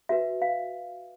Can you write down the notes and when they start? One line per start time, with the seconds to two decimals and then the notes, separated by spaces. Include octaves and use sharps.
0.09 F#4 B4 E5
0.42 F5